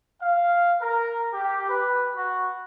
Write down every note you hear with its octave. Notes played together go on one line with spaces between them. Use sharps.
F5
A#4
G4
B4
F#4